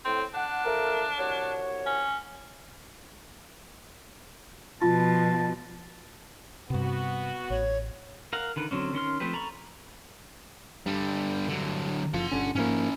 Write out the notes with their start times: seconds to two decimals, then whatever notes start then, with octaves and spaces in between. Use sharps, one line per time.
0.05 A2 C4
0.34 D4 F#5
0.65 F3 A3 A#4
1.18 C2 F#4 C#5
1.86 C#4
4.82 B2 F3 F4 A5
6.70 G2 C3 B3 F#4
7.50 A1 C#5
8.33 A#4 F5 F#5
8.56 D3 D#3 B4
8.71 D3 F#3 C4 C#4
8.93 D#3 C#4 C6 F6
9.20 F3 A3 C4 G4 B4
9.33 A4 A#5 B5 C#6
10.86 G2 D3 G3
11.48 D3 F#3
12.14 F#1 F3 F#5 C6
12.32 G1 D3 C#4
12.55 G#2 F3 A#3 C#4 E4